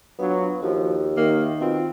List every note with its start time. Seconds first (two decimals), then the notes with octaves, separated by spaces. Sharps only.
0.19 F#3 B3 D4 F4 F5
0.63 D#2 F3 F#4
1.17 D#3 A#3 E5
1.61 B2 C4 F4 F5